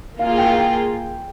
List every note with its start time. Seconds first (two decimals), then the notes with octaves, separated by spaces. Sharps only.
0.19 A#3 F4 G#4 F5
0.38 G5
0.46 F5
0.54 G5